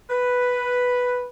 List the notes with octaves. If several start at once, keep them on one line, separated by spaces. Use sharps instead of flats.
B4